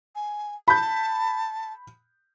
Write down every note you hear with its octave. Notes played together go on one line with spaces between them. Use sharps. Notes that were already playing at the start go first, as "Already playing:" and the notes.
G#5
A5 B5 G6